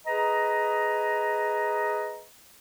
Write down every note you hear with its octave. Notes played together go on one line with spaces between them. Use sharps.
G#4 B4 D#5 A#5